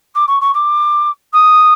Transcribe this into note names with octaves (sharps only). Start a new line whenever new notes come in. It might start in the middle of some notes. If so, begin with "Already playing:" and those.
D6
C#6
C#6
D6
D#6